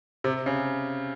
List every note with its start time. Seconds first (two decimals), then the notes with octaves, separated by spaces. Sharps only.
0.24 C3
0.46 C#3